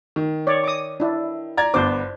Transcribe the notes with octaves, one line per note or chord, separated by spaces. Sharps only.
D#3
C#5 D5
D6 D#6
D4 E4
D5 A#5 G#6
G1 B3 D4 C5 D6